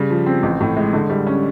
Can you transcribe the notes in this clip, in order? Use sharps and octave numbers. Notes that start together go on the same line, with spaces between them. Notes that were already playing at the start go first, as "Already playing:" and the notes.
Already playing: C#3 G3
F3
C4
A1
A2
G#3
D3
G3
C#4